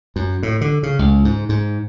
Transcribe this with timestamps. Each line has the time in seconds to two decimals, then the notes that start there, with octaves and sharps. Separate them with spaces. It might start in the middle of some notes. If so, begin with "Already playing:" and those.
0.16 F#2
0.43 A2
0.61 D3
0.83 C#3
0.99 C#2
1.25 G#2
1.49 G#2